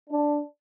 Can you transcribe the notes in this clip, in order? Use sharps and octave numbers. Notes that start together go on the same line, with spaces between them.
D4